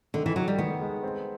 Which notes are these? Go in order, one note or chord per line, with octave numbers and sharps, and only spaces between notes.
D3 D#3
E3
D#3 F#3
G3
D#3 B3
G#3
C4